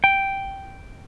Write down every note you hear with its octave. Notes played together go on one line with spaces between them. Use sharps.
G5